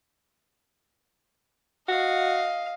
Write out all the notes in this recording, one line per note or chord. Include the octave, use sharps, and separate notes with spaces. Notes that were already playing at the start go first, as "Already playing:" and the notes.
F#4 D#5 F5